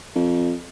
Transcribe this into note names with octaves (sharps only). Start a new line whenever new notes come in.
F2